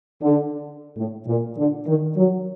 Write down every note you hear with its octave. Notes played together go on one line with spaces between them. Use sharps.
D3
A2
A#2
D3
D#3
F#3